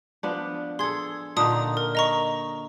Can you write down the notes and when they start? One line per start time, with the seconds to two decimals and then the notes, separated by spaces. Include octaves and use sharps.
0.23 F3 B3 D4
0.79 G#4 A4 C6 G#6
1.37 A#2 D3 D#4 A5 D#6
1.77 A#4
1.95 D#5 A#5 C#6